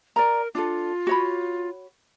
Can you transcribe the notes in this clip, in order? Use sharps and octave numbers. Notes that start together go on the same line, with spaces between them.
A#4 D5 A#5
D4 F4 A4
F#4 C#5 B5